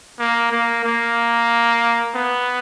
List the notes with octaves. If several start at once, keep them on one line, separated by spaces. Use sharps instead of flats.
A#3
A#3
A#3
B3